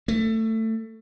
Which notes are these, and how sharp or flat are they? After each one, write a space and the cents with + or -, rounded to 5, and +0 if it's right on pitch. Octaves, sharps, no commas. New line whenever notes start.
A3 +20